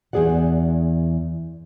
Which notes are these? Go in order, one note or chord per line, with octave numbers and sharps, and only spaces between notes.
E2 D#3 G#4 D5 F#5